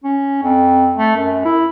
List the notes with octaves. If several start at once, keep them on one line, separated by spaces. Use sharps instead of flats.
C#4
F2
A3
F#2
E4